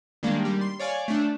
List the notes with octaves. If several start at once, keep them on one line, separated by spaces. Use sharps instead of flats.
D#3 G3 G#3 A#3 D4
G3
C6
C#5 D5 F5 G#5
A3 D4